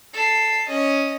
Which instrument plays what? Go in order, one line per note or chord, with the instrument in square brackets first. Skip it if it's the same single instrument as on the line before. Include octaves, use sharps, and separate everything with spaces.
[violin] A4 C7
C#4 D#5